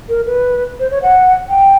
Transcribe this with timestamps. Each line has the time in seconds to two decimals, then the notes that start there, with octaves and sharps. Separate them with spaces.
0.09 A#4
0.26 B4
0.79 C5
0.91 C#5
1.03 F#5
1.49 G5